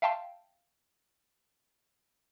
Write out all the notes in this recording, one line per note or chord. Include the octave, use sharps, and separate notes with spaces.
E5 F5 G5 A5 C6